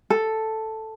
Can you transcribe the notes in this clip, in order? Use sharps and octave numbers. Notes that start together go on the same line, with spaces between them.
A4